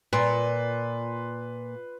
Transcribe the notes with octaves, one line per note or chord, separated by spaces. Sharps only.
A#2 B4 C6